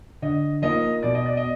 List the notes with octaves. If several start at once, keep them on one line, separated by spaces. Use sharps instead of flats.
D3 D#5
F3 A#3 D#4 D#5
B2 D5
D#5
D5
D#5